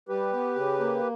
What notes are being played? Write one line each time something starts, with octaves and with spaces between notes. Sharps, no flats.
G3 G4 B4
B3
C#3
A#3